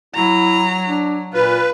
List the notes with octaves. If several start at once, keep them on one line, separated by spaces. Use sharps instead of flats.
F#3 E4 A#5
D4
A#2 F4 B4